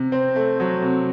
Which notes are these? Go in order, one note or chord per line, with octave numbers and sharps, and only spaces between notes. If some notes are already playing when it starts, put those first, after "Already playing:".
Already playing: C3
C4
A3
F#3
C3